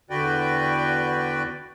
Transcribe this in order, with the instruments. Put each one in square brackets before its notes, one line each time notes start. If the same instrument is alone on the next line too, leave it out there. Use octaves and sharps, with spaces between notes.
[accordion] E2 D3 F#4 B4 D5 G5